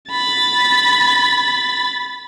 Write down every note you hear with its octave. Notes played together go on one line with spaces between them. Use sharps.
B5 A6